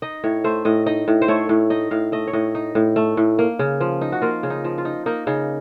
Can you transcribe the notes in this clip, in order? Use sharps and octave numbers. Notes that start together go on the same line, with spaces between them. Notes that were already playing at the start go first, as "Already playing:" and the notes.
D#4 D#5
A2 C#5
A3 C5
A2 D#5
D#4 D#5
A2
C5
A3 C#5
A2
D#4 D#5
A2 F5
A3 D#5
C#5
A2 D#5
D#4
A2
A3
A2
A#3
C#3
F3
D#4
F#4
A#3 F4
C#3
D#4
F3
F4
D#4
A#3 D#4
C#3 D#4